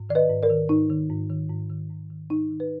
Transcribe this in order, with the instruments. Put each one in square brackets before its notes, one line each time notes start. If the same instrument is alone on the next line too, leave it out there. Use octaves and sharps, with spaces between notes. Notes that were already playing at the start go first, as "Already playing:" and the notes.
Already playing: [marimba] G#2
D#3 D5
B4 D#5
G#2
A#4 D5
D#3
G#2 D#4
D#3
G#2
D#3
G#2
D#3
G#2
D#3
G#2 D#4
D#3
B4